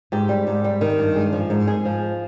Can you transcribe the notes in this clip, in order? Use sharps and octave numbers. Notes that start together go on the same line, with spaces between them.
G#2 G4
G3
G#2
G3
D#3
G2
G#3
F3
G#2
G#3 G#4
F3